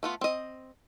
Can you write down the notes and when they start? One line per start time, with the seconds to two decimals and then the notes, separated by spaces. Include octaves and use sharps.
0.03 A3 B3 F4
0.21 C4 D#5